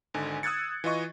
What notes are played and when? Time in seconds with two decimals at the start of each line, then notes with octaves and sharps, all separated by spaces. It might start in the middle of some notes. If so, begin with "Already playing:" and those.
0.14 G#1 D3 D#4 G#5
0.43 D#6 E6 F#6 G#6 A6 C#7
0.84 E3 F4 D#5 C#6